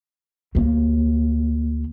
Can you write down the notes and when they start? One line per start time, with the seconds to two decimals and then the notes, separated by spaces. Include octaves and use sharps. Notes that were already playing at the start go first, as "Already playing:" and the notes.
0.55 D2 A#3